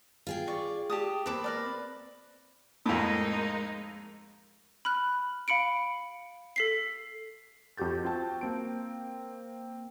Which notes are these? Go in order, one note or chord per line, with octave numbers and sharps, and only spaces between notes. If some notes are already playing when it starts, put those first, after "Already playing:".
F4 G#4 G5
D5 C#6
G4 A5 D#6
A#3 C4 B4 A5 D6
A#4 B4 D5
F2 A2 G#3 A#3 D#4
B5 F6 F#6
F5 B5 C#7 D7
A4 B6 C7
F2 F#4 G4 G6 A6
C4 F4 F#4 G5 A5
A#3 C4 D7